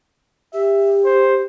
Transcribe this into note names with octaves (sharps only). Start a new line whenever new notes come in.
G4 E5
C5